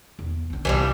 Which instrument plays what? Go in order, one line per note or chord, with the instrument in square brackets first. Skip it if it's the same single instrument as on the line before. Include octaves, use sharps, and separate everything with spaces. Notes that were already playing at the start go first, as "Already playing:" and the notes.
[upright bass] E2
C#4 D4
[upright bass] C2 [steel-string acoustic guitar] E3 F3 G3